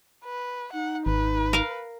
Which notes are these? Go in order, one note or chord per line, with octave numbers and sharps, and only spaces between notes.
B4
D#4 F#5
G#1 B4
A#4 F5